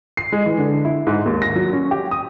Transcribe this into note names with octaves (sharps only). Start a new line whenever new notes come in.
C7
G#3
E3
D3
E4
G#2
D#2
A#6
F#3
C#4
G4
D#6